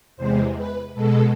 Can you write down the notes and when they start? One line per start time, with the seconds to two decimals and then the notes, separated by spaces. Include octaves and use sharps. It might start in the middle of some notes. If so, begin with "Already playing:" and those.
0.17 E2 C3 G#3 C5
0.57 B4
0.94 B2 G#3 A4